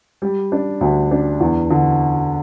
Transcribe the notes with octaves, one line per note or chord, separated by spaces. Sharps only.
G3
D4
D2
D4
E2
D3